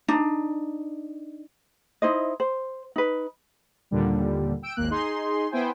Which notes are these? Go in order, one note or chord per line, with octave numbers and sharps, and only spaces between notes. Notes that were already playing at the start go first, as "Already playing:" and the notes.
D4 D#4
D#4 E4 C5 D#5
C5
D#4 B4
D#2 A#2 D3 G3
G5 E6 D7
G#1 D#2 A#3 F#6
D#4 G#4 C6
B3 E4 C5 G5 G#5